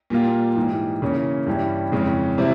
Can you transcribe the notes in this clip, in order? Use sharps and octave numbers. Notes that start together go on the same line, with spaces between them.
A#2 G3 A#3 F4
G#2 E3 G3
C#3 E3 A#3 C#4
G2 E3 G3 C#4 E4
F2 C#3 E3 G#3 C#4
C3 E3 G3 C4 E4